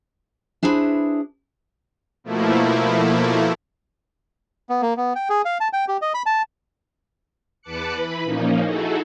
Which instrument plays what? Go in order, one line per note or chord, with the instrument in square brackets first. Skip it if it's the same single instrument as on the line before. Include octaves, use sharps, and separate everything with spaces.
[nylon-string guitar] D4 E4 G#4 A4 B4 C5
[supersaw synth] B2 F3 A3 A#3 E4
[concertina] B3
A#3
B3
G5
G#4
F5
A5
G5
G4
D#5
B5
A5
[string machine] E2 B4 A5 D6 F#6 C#7
E3 B4 B5
A#2 F3 A#3 C#4 D#4
D#4 E4 F#4 G#4 A4